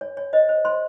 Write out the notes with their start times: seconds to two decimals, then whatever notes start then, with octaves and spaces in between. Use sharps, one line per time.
0.01 C#5
0.17 C#5
0.33 C5 D#5
0.49 C5
0.65 C5 C6